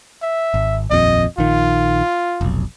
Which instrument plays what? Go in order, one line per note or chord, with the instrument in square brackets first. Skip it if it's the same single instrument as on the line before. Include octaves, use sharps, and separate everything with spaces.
[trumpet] E5
[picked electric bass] G#1
[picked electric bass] D#1 A#1 F2 [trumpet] D#5
[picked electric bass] A#1 D#3 [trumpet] F4
[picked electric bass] F1 B1